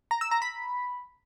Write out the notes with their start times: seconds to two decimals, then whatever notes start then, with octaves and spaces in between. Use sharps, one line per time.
0.11 A#5
0.21 E6
0.31 A#5
0.42 B5